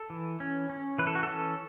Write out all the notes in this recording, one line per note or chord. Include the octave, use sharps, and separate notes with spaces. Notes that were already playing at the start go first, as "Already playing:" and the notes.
Already playing: A4
E3
C#4
C#4
E3 B4
A4
F#4
C#4 A4